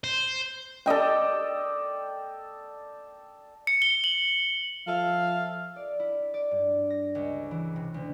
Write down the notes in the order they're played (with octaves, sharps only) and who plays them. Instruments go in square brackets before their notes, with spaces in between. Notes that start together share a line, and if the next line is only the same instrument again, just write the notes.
[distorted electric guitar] C5
[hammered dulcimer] A4 D5 D#5 G5
[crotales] C#7
G7
F#7
[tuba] F3 [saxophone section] A4 E5 F5
[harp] D5
E4
D5
G2
A#6
C#2
E3
C3
D2